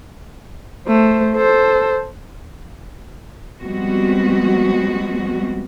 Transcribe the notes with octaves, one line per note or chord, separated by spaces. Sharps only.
A3 C5
A4 C5
F3 G3 G#3 B3 C4 F#4